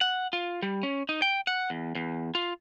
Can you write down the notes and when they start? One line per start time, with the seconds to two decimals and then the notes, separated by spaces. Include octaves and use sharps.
0.01 F#5
0.33 F4
0.63 G3
0.83 C#4
1.09 D#4
1.22 G5
1.47 F#5
1.70 E2
1.95 E2
2.35 F4